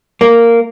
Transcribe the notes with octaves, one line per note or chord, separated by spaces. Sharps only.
A#3